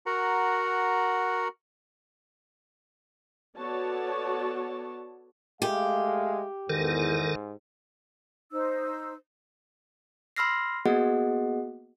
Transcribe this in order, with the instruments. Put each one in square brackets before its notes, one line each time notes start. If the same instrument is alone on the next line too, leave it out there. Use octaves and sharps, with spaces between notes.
[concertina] F#4 A#4 F#5 A#5
[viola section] B3 F#4 A4 C#5 D5 A5
[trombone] G#3 [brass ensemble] A3 E5 F5 [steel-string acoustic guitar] G4
[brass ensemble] E2 [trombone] G#2 [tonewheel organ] D#3 A4 A#4
[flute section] D#4 C5 E6
[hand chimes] B5 C6 E6 F6 A#6 C7
A#3 B3 F#4 G#4 D#5 F#5